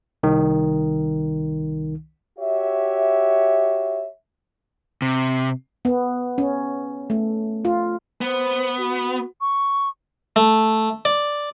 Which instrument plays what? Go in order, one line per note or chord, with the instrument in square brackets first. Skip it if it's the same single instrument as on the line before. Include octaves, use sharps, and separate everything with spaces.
[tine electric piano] C2 D#3
[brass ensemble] F#4 G4 C#5 E5
[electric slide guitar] C3
[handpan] B3
C#4
A3
F4
[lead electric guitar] B3 [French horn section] C5
[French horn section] F#4
[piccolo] C#6
[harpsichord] A3
D5